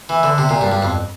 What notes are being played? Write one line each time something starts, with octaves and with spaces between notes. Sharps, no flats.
E3
D3
C3
A#2
G2
G2
F2